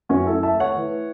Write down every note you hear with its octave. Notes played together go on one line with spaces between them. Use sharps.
F#2 C#4 F#4
E4 A4
A3
E5 A5
A3
C#5 F#5
E3